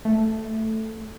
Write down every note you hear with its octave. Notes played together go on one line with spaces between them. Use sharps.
A3